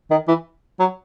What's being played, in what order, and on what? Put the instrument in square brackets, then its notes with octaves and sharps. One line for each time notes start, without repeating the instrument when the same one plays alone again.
[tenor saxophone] D#3
E3
F#3